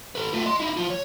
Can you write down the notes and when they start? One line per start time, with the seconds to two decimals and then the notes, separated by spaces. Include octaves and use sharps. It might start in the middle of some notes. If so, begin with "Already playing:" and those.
0.15 A4 B4
0.33 A3 F4
0.46 D#5 C6
0.60 D#4 E4
0.77 F3 F4
0.90 C#5